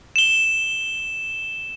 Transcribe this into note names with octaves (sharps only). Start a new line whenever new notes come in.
E7 G7